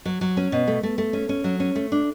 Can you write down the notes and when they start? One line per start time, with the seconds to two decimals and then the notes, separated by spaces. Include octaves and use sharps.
0.05 F#3
0.21 F#3
0.37 C#4
0.52 B2
0.67 A3
0.83 A3
0.98 A3
1.13 C#4
1.29 C#4
1.44 F#3
1.60 C#4
1.76 A3
1.92 D4